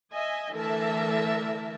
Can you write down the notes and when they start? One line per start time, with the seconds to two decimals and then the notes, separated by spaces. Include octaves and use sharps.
0.12 D#5 E5 G#5
0.52 D3 E3 A3 A#4 E5 A5